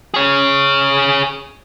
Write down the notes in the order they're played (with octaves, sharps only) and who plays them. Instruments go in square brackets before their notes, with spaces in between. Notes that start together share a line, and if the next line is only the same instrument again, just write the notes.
[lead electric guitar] G#4 C#5